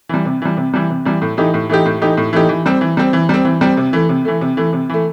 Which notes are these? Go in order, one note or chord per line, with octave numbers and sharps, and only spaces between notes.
E3 G3
C3
E3 G3
C3
E3 G3
C3
E3 G3
A2
E3 A3 D#4 G4
A2
E3 A3 D#4 G4
A2
E3 A3 D#4 G4
A2
E3 A3 D#4 G4
E3
G3 C4
E3
G3 C4
E3
G3 C4
E3
G3 C4
C3
E3 A3
C3
E3 A3
C3
E3 A3
C3
E3 A3